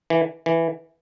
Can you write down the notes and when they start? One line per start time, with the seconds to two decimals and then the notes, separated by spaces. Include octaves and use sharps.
0.10 E3
0.46 E3